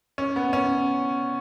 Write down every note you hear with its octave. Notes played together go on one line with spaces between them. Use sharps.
C#4
B3
C#4